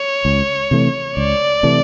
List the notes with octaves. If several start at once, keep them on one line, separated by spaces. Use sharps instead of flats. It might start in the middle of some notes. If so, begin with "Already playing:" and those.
Already playing: C#5
C#2
C3 E3 A3
C#2 D5
C3 E3 A3